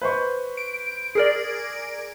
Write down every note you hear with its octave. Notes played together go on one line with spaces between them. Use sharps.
B4 C5 C#6
D7
G#4 A#4 D5